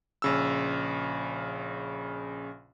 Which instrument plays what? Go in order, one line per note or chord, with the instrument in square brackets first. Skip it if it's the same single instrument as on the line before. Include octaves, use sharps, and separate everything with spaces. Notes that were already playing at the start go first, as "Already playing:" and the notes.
[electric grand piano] A#1 C#3 E6